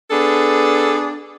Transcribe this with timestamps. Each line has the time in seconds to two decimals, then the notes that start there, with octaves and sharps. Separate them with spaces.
0.11 B3 D4 G#4 A4